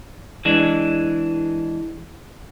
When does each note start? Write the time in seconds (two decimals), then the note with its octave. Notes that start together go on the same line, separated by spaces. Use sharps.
0.45 E3 G#3 D4